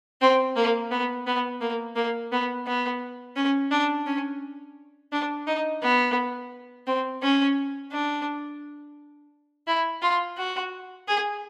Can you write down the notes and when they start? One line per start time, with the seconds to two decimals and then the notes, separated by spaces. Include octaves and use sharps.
0.21 C4
0.56 A#3
0.91 B3
1.27 B3
1.61 A#3
1.96 A#3
2.32 B3
2.67 B3
3.36 C#4
3.71 D4
4.07 C#4
5.12 D4
5.47 D#4
5.82 B3
6.87 C4
7.22 C#4
7.92 D4
9.67 E4
10.02 F4
10.37 F#4
11.08 G#4